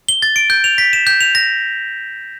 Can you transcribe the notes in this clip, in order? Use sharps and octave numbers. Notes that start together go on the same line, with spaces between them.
G7
A6
D7
G6
F7
B6
E7
G6
F7
A#6